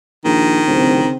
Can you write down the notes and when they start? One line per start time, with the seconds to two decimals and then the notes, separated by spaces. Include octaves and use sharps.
0.25 A#1 D#3
0.68 D1 C#3 C4